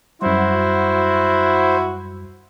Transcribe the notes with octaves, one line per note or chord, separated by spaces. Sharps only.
F#2 G3 E4 F#4 C5